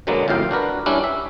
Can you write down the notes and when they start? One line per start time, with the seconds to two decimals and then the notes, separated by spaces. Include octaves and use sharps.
0.07 B2 D3 F#3 G#3 A#3 B3
0.28 G1 F2 A2 F5 G5
0.51 D4 F#4 A#4 B4
0.86 G3 C#4 D4 E4
1.04 E5